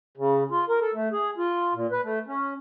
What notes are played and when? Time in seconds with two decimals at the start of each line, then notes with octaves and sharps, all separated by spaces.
0.17 C#3
0.51 F4
0.69 A#4
0.81 A4
0.94 A3
1.12 G#4
1.38 F4
1.74 A#2
1.91 B4
2.03 A3
2.27 C#4